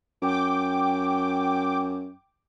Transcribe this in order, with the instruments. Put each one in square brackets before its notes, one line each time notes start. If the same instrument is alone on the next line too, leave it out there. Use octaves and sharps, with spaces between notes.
[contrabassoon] F#2 [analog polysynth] G5 D6